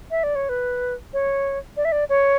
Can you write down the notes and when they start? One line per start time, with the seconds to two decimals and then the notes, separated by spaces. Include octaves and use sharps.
0.11 E5
0.23 D5
0.35 C#5
0.49 B4
1.13 C#5
1.77 D5
1.85 E5
1.92 D5
2.09 C#5